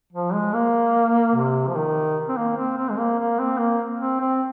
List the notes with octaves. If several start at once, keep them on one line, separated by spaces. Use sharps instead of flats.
F3
G#3
A#3
C3
F3
D#3
C4
A#3
C4
C4
G#3
A#3
A#3
C4
A#3
C4
C4